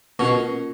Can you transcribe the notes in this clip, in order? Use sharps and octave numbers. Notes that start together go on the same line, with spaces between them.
B2 A#3 C#4 F4 A#4